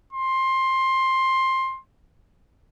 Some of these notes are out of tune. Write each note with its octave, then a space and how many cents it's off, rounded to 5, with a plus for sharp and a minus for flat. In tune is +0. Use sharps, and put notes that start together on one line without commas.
C6 +15